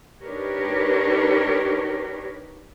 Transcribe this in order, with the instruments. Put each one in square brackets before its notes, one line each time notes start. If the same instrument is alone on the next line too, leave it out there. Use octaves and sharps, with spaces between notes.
[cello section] D4 D#4 G4 A#4 B4 C#5